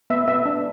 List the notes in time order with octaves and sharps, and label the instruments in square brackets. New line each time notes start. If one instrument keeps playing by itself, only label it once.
[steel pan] B3 E5
B3 E5
D4